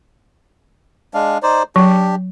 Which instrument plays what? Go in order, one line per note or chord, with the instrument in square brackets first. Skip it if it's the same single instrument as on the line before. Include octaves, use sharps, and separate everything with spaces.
[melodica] G#3 D4 F5
D#4 C5 D5
[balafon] F#3 [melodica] D4 G4